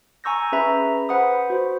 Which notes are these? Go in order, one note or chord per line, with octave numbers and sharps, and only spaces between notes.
G#5 A#5 C#6 E6 G6 A#6
C#4 G#4 B4 E5 A#5 B5
B4 C5 F#5 B5 D#6
F#4 C5